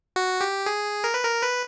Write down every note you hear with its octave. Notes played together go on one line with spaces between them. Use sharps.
F#4
G4
G#4
A#4
B4
A#4
B4